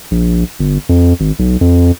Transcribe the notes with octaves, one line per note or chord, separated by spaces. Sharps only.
A#1
G1
F2
G#1
B1
F2